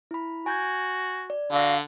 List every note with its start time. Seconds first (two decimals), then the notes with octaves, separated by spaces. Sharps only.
0.11 E4 B5
0.46 F#4 G#5 G6 G#6
1.30 D5
1.52 D3 F#4 F5